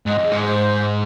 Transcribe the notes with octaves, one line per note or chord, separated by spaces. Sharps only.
G#2 D#5
F2
G#4
G#2
C5